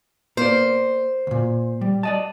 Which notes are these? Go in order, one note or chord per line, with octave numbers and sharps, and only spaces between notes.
A#3 C5 D5
D2 A#2
G3
D5 D#5 A5